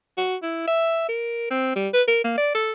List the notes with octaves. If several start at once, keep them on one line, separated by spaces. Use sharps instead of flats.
F#4
E4
E5
A#4
C4
G3
B4
A#4
A#3
D5
A4